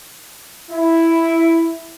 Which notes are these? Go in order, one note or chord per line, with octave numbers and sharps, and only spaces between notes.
E4